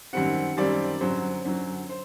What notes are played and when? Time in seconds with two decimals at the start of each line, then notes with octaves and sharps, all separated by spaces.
0.13 F#2 D#3 G3 C4 F#5
0.57 F#2 D#3 G3 C4 D5
1.01 F#2 D3 F#3 C5
1.45 F#2 D3 F#3
1.90 C5